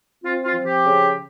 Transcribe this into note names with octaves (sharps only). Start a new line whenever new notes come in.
C4 F4
F4
F3
G4
C#3